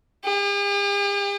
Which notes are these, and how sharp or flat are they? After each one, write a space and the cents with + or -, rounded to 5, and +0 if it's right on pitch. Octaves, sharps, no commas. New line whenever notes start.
G4 +45